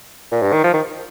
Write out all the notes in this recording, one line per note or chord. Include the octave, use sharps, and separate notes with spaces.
A#2
G2
D#3
F3
D#3